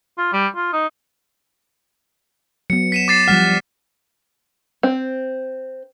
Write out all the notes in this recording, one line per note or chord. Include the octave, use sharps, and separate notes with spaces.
F4
G3
F4
D#4
F#3 B3 C#7
B6 D#7 E7
D6 A6 C7
F3 G3 F#5 F6 B6
C4